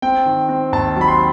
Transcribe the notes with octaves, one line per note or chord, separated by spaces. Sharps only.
C4 G5
D#3
C4
D#2 A5
F#3
B5
C6